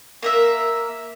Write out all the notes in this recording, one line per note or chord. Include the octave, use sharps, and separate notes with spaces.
A#3 A#4 E5